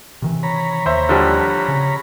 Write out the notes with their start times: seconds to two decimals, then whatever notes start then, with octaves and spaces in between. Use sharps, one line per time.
0.22 C3 D#3 E3
0.43 C#5 A#5 B5
0.86 D#2 C5 E5
1.09 D3 F3 G3
1.68 C#3